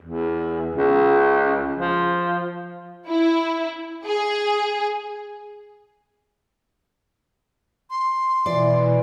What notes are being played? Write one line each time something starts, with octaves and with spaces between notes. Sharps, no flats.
E2
C#2
F3
E4
G#4
C6
B2 E3 D5